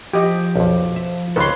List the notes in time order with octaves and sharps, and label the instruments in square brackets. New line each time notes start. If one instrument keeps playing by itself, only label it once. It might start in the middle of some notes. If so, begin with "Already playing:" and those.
[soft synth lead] F3 [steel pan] G4 D#5
[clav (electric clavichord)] B1 F2
E5
[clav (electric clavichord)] C#2 D#3 A4 [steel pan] B4 C#5 C6